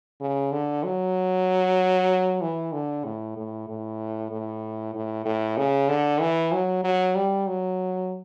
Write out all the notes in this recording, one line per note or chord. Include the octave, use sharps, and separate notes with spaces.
C#3
D3
F#3
E3
D3
A2
A2
A2
A2
A2
A2
C#3
D3
E3
F#3
F#3
G3
F#3